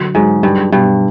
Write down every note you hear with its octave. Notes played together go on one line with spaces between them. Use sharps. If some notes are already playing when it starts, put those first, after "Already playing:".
Already playing: D3 F#3
G#2 F#3
G2 D#4
G2 B2